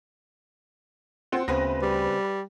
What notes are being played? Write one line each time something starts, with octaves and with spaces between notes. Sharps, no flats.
C4 F4 F#5
D2 C#3 B3 C4 B4 A#6
G3